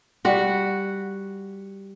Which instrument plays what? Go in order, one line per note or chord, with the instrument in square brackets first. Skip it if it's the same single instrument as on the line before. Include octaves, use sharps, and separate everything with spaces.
[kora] G3 F#4 F#5